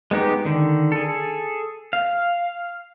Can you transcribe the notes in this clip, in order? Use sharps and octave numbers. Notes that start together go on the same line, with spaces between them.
G#3 B3 D#4 G4
D3 D#3
G#4 A4
F5